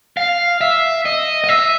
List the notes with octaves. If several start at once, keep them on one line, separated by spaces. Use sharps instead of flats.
F5
E5
D#5
D#5
E5